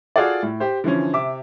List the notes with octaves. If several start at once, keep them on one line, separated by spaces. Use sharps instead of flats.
F4 F#4 G#4 A4 D5
A2
G4 C5
D3 E3 F3 C#4
C3 E5 D6